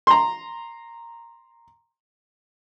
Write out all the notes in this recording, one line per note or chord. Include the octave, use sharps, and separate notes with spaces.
A#5 C6